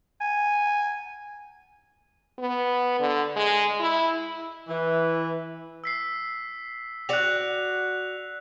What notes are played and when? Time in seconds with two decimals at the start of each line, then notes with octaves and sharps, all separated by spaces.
0.20 G#5
2.39 B3
3.00 D3
3.36 G#3
3.80 E4
4.69 E3
5.84 E6 B6 C7
7.09 F#4 D5 F#6 F7